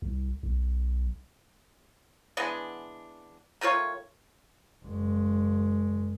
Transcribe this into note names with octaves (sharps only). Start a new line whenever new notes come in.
C2
B1
E3 G#3 B3 D4
D#3 A3 F4 C#5
F#1 G#3